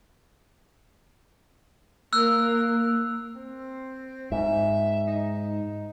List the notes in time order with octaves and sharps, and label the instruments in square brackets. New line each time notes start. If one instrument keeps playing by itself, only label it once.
[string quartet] A#3 A#4 [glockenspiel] E6 F#6
[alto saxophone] C4
[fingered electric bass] G#2 [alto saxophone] E5
[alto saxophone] D#4